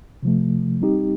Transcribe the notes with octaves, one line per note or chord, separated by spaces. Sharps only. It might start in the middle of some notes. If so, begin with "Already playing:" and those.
C3 F3 A3
G3 C4 D#4 G4